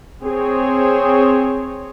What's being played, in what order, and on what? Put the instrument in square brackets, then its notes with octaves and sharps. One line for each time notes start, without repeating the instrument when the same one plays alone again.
[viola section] C4 G#4 C#5